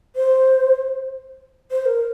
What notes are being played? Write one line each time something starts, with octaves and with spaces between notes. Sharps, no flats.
C5
C5
A#4